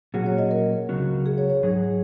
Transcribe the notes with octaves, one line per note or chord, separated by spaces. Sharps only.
A#2 F#3 C#4 F#4 G#4
C#5
D#5
A#4
C#2 C#3 F#3 C#4 F#4
G#4
C#5
C#5
G#2 F#3 D#4 G#4